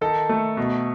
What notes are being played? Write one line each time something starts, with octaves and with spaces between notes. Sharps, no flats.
D#3 A4
A3
B2